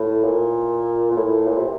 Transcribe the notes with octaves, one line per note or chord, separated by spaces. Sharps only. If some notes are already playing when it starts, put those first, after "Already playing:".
Already playing: A2
A#2
A#2
A2
A#2
C3